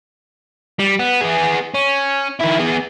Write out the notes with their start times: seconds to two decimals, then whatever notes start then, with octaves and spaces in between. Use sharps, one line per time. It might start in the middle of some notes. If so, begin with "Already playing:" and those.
0.79 G3
0.99 B3
1.21 B3 G#4
1.74 C#4
2.41 D#3 E4
2.60 B3 G#4